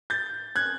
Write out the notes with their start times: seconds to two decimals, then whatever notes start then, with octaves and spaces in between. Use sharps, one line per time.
0.10 G6 A6
0.56 F#6 G#6